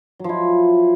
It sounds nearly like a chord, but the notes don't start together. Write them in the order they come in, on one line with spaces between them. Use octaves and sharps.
F#3 F3 E4